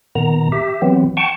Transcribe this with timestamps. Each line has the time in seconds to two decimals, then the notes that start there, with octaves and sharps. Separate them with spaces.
0.15 A#2 D#3 B3 A#5
0.52 G4 E5
0.82 E3 F#3 B3 C4
1.17 F#5 G5 A5 C#6